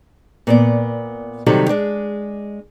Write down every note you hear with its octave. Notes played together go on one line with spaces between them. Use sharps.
A#2 B3 D5
C3 D#3 F#3 G3 G4 A4
G#3 D4